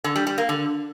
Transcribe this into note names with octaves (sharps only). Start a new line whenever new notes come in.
D3
G3
G3
A#3
D3